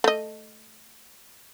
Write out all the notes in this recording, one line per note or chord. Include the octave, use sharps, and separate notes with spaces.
A3 D#5